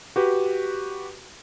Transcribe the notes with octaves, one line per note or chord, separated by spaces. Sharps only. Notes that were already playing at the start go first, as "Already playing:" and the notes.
F#4 G4 B4